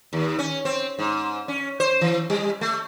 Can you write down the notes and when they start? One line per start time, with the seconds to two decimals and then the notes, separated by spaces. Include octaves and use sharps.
0.13 D#2
0.39 C#4
0.65 C4
0.99 G#2
1.48 C#4
1.80 C5
2.01 E3
2.30 G3
2.61 A3